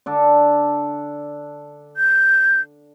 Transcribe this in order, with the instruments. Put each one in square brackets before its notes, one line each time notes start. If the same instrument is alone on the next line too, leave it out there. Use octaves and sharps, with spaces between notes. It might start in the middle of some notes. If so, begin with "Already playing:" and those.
[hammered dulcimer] D3 D4 A4
[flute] G6